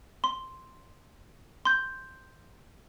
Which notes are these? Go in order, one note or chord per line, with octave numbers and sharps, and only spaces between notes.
C6
C6 G6